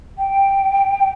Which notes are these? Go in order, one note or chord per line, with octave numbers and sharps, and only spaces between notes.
G5